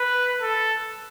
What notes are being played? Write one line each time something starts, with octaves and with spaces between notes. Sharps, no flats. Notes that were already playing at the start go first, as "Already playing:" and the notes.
Already playing: B4
A4